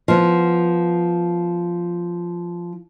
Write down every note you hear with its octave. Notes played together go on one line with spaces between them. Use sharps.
F3 B3